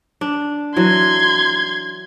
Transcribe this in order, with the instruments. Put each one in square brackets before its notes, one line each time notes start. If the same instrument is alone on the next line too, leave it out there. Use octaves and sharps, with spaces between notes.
[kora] D4
[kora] E3 F#3 [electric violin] C6 G#6